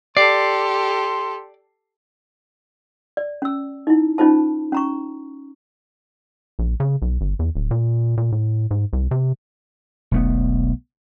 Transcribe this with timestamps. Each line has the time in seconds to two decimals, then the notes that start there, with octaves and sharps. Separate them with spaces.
0.17 G4 A4 D5 C6 C7
3.17 D5
3.42 C#4 E6
3.87 D#4 E4
4.18 C#4 D#4 F4 C5 A5
4.72 C#4 A#5 C#6
6.59 A#1
6.80 C#3
7.02 B1
7.21 G1
7.39 E2
7.55 D1
7.71 A#2
8.17 A#2
8.32 A2
8.71 G#2
8.93 C2
9.11 C3
10.11 E1 B1 A3 B3